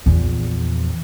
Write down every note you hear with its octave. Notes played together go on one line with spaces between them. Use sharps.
A#1 E2